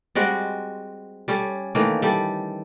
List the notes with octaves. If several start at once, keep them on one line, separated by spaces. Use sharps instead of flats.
G3 G#3 C4 F#4
G3 C#4 A4
D#3 E3 A3 A#3
G3 A4